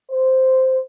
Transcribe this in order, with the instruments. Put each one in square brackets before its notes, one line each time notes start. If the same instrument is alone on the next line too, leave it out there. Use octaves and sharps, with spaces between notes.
[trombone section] C5